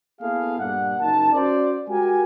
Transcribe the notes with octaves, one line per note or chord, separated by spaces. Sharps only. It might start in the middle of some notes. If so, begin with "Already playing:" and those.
A#3 B3 E4 G#4 A4 F5
G2 A#2 D4 F#5
F#1 D#4 A#4 A5
C#4 F#4 C5 D5
G#3 F#4 G4 A#4 G#5